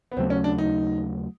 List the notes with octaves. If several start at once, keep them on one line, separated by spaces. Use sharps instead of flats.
B3
D#2 C#3 F#3 A3 C4
C#4
D4
D#4